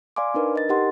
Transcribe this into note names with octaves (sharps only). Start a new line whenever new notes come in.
D5 F5 G#5 C6 D6
D4 D#4 A#4 B4
D#5 A6
D#4 G4 A#4 D#5 F#5 C6